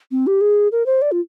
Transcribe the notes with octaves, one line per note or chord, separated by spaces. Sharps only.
C4
G4
G#4
A#4
C5
D5
F4